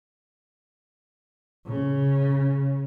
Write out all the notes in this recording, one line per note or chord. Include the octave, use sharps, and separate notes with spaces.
C#3